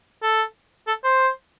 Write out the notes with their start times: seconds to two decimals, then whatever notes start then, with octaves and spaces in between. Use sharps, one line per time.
0.22 A4
0.87 A4
1.04 C5